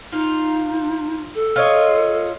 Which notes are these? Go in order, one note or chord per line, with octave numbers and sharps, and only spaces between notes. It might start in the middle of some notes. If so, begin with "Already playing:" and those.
D#4 F4
A4
F4 C#5 D#5